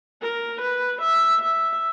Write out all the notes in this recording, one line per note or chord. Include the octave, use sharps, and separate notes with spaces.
A#4
B4
E5
E5